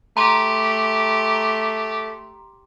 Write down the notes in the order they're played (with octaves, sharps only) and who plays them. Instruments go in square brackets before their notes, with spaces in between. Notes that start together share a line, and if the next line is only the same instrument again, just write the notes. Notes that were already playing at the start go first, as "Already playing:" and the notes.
[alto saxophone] A3 [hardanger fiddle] G4 [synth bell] A#5 C6